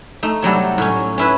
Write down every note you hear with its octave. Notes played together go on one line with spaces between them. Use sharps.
A3 D#4
C3 F#3 G3 A4
A2 C#4
C#4 E4 B4